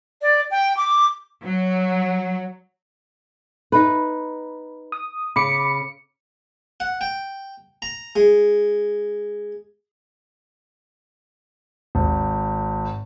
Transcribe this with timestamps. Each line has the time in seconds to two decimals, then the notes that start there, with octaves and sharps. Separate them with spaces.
0.22 D5
0.51 G5
0.77 D6
1.45 F#3
3.72 D#4 B4
4.92 D#6
5.36 C#3 B5 D6 C#7
6.80 F#5
7.01 G5
7.82 A#5
8.16 G#3
11.95 G#1